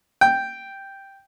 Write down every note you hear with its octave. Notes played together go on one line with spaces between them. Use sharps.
G5